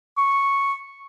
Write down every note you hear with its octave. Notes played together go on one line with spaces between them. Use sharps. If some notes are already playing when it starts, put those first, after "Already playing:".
C#6